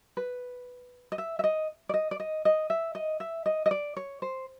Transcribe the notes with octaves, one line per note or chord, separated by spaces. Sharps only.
B4
D#5
E5
E5
D#5
D5
D#5
D5
D#5
D#5
E5
D#5
E5
D#5
D#5
D5
C#5
C5